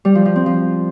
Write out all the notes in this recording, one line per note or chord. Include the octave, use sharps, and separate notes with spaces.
G3
F3
F3
C4
F3